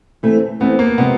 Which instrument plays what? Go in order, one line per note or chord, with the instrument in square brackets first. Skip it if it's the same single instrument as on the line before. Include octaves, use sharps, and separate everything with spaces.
[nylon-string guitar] E3 A3 C4
[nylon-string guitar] E3 A3 C4 [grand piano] B3
[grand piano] A#3
[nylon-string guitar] C3 F3 G#3 [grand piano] B3